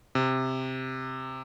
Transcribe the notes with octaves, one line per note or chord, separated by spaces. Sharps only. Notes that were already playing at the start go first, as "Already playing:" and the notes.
C3